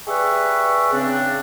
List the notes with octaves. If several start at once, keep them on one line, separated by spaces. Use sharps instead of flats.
G4 G#4 B4 D5 E5 C#6
C#3 C4 D4